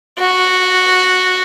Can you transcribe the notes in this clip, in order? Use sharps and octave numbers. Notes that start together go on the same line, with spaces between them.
F#4